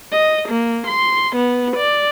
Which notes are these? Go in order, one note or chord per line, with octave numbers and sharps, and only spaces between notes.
D#5
A#3
C6
B3
D5